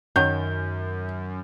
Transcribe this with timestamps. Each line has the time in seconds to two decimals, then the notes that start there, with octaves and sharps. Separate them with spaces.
0.16 F#2 D#3 F#3 G6